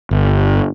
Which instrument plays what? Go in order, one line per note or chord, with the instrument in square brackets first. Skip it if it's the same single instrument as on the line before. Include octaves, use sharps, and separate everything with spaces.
[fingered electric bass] G1